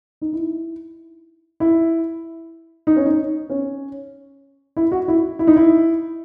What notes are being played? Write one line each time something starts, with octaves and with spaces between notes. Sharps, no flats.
D#4
E4
E4
D#4
C#4
D#4
C#4
E4
F#4
E4
E4
D#4
E4